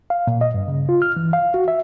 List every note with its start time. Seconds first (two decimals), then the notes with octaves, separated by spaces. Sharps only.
0.10 F5
0.27 A#2
0.41 D#5
0.54 G2
0.68 C#3
0.89 F4
1.02 F6
1.17 E3
1.33 F5
1.54 F#4
1.68 E5